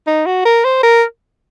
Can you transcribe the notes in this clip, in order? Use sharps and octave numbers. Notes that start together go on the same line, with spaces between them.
D#4
F#4
A#4
C5
A#4